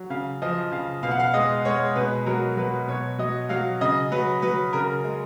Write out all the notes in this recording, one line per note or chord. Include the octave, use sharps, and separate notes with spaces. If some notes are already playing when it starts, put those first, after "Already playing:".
Already playing: F#3
C#3 F5
F3 D#5
C#3 F5
B2 F5
F#5
F5
G#3 D#5
G#3 C#5
B2 B4
F#3 A#4
F#3 B4
B2 C#5
F#3 D#5
F#3 F5
C#3 D#5
F#3 B4
F#3 B4
C#3 A#4
G#3